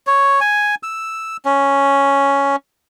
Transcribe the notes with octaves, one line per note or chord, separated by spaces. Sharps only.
C#5
G#5
E6
C#4